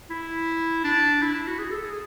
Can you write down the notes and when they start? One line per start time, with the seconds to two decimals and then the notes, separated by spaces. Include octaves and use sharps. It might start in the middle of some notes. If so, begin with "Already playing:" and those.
0.10 E4
0.84 D4
1.22 E4
1.34 E4
1.47 F#4
1.59 G#4
1.71 A4
1.84 G#4